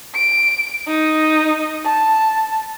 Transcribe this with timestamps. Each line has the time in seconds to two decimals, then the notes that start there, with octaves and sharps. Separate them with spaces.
0.15 D7
0.88 D#4
1.85 A5